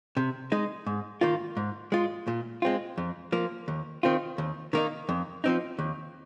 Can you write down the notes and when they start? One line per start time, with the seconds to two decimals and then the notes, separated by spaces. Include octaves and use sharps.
0.17 C3
0.52 G#3 D#4
0.86 G#2
1.21 D#3 A#3 F4
1.57 G#2
1.92 G#3 F4
2.28 A#2
2.62 G#3 C4 F4
2.98 F2
3.32 F3 A#3
3.68 D#2
4.03 D#3 C4 F4
4.38 D#2
4.73 D#3 A#3 D#4
5.09 F2
5.44 F3 C4 D#4
5.79 D#2